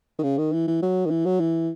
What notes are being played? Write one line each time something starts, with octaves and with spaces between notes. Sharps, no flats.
D#3
C#3
D#3
E3
E3
F#3
D#3
E3
F#3
E3